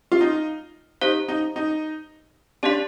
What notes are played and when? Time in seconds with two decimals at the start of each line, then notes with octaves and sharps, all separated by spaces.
0.12 F4
0.21 D#4
1.01 D#4 G4 C5 F5
1.28 D#4
1.56 D#4
2.63 D4 G4 D5 F5 C6